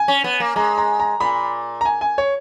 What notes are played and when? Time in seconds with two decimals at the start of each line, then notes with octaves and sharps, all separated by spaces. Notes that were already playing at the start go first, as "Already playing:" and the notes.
Already playing: G#5
0.08 C#4
0.24 B3
0.40 A#3
0.56 G#3 A#5
0.78 A#5
1.00 A#5
1.20 A#2 B5
1.81 A#5
1.85 G#5
2.01 G#5
2.18 C#5